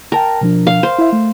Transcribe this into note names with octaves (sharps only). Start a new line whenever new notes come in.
A#4 G5 A5 A#5
B2 F3 D4
F5
C5
E4 E5
A3